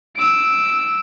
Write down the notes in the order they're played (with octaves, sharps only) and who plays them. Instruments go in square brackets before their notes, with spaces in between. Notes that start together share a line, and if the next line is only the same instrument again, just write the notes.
[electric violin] E6 D7